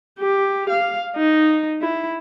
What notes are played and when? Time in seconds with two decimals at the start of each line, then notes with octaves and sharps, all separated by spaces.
0.20 G4
0.69 F5
1.16 D#4
1.81 E4